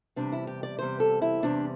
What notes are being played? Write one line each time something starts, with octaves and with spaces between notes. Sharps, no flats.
E2 C3 G3 C4 D4
E4
G4
D5
E2 C3 G3 C4 C5
A4
E4
E2 C3 G3 C4 D4